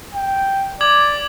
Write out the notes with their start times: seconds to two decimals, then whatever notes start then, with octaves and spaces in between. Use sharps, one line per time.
0.15 G5
0.81 D5 D6 G#6 F#7